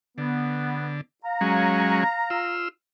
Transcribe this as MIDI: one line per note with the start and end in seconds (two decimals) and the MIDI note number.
0.18 1.01 50
0.18 0.98 59
1.24 2.56 77
1.24 2.56 82
1.41 2.04 54
1.41 2.04 56
1.41 2.04 61
2.30 2.68 65
2.30 2.68 88